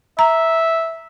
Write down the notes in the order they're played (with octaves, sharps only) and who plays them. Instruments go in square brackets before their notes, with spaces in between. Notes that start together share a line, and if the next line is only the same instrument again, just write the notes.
[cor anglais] E5 [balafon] A#5